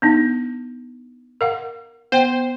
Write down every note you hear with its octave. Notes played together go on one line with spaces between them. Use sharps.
B3 D4 D#4
A#4 F5 F#5
B3 C5 G5